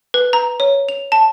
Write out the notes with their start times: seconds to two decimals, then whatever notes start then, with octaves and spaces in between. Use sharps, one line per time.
0.14 B4
0.33 A#5
0.60 C#5
0.89 F7
1.12 A5